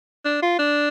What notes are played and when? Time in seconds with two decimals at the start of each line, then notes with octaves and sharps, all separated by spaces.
0.25 D4
0.42 F4
0.59 D4